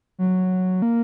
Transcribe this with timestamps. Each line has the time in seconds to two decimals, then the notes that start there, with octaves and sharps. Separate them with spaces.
0.19 F#3
0.82 A#3